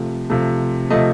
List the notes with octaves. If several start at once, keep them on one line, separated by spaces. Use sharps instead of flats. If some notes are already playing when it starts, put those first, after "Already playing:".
Already playing: C3 F3 A3
C3 F3 A3
C3 F3 A3 D#5